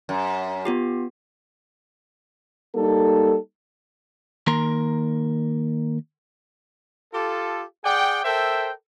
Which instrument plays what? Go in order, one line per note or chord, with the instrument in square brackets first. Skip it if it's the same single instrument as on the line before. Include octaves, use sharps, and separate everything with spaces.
[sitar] F#2
[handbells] B3 F4 G4
[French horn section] G3 A#3 D#4 A4
[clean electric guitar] D#3 A#3 A#4 A#5 C6
[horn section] F4 G4 A4
G#4 D5 F#5 G5
A4 A#4 C5 E5 G5